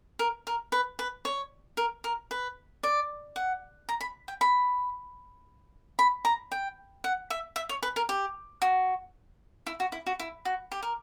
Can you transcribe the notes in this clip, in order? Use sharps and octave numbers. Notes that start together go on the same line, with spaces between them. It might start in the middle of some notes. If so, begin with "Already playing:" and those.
A#4
A#4
B4
B4
C#5
A#4
A#4
B4
D5
F#5
A#5
B5
G5
B5
B5
A#5
G5
F#5
E5
E5
C#5
B4
A#4
G4
F#4
E4
F#4
E4
F#4
E4
F#4
G4
A#4